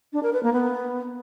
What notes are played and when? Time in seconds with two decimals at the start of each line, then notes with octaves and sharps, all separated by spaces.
0.13 D4
0.23 A#4
0.33 B4
0.43 A#3
0.53 B3